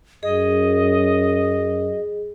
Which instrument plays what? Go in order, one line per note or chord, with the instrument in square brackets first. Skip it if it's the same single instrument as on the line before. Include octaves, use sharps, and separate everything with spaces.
[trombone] F#2 [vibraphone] G#4 [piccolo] D#5